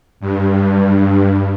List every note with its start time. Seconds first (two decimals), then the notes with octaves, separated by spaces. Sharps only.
0.20 G2